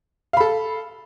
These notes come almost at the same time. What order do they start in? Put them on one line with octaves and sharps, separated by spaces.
F5 B5 A4